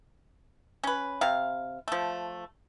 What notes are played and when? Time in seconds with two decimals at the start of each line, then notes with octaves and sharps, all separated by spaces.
0.84 C#4 B4
1.21 C3 F5
1.88 F3 A3